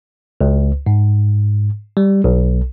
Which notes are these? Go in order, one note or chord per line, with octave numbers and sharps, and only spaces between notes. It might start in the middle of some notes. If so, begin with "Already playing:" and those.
C#2
G#2
G3
B1